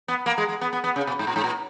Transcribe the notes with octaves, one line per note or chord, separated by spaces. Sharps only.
B3
A#3
G#3
G#3
B3
B3
B3
C#3
B2
G#2
A#2
G#2
A#2